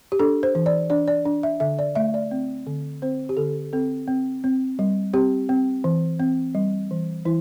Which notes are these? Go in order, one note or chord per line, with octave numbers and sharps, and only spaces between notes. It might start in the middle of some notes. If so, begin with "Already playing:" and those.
G4
D4 A4
C5
E3
D5
D4 D5
D5
D4
E5
D3 E5
D5
A3 E5
D5
C4
D3
C4 C5
G4
D3 A4
C4 A4
C4
C4
G3
C4 G4
C4
E3
C4
G3
E3
E3 E4